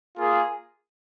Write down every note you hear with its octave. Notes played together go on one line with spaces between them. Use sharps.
A#3 F4 G#4